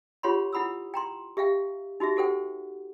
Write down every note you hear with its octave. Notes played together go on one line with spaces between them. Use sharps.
F4 G4 C#5 F#5 B5 C6
E4 F#5 B5 D#6 E6
G5 A#5 C6
G4 E5 F5 G5
D#4 F#4 G4 E5
F#4 G4 A4 C5 F#5 G5